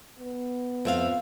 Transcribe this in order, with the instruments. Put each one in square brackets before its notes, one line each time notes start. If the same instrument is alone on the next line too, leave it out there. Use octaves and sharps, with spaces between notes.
[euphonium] B3
[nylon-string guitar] F2 E5 F5